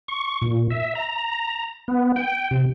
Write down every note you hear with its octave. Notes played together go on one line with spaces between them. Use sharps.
C#6
A#2
E5
A#5
B3
G5
C3